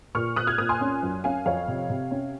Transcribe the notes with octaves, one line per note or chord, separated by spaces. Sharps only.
A#2 C#6 F6
A#2 D#6 F#6
F6 G#6
A#2 D#6 F#6
G#5 C6
C#4
F#2
C#4 F5 G#5
F2 C#5 F5
C3
C3
C#4